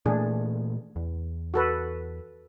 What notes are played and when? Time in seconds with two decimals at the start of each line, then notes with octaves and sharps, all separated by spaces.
0.06 A#2 E3 A3 D4 G#4
0.96 E2
1.54 F#4 A4 B4